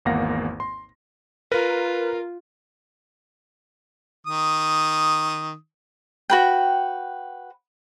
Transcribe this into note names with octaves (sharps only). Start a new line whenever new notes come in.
G#1 E2 A#3 F5 F#5 A#6
C6
F4 A#4 B4
D#3 D#6
F#4 B4 G5